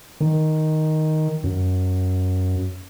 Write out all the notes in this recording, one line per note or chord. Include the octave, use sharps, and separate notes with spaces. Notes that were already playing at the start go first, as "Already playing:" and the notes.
D#3
F#2